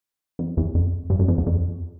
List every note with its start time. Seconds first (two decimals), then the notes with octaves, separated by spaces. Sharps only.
0.39 F2
0.57 E2
0.75 F2
1.10 G2
1.19 F#2
1.28 F2
1.38 E2
1.46 F2